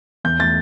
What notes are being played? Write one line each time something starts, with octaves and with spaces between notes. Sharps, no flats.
E2 G6
A3 A6